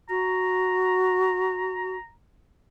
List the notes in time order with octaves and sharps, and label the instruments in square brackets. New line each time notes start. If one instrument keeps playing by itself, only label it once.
[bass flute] F#4 [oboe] A#5